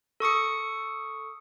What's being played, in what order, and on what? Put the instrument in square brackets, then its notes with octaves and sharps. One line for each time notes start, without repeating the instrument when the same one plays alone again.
[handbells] A4 C#6 D#6 C#7